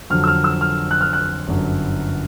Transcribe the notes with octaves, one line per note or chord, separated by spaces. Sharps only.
F2 D3 F#3 F6
E6
F6
E6
F6
F#6
F6
F#6
G1 F#2 D3 F#3